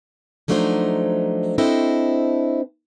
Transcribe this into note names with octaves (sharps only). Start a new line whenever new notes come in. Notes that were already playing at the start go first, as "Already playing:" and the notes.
F3 F#3 A3 D4 D#4 C5
C4 D4 E4 A4 C5 D#5